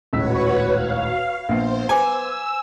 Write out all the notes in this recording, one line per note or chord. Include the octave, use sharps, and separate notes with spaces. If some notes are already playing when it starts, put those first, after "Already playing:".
D#1 C#2 A2 F#4 B4 C#5 E6 B6
F5
A#1 B3 C5 C7
B4 G#5 D6 E6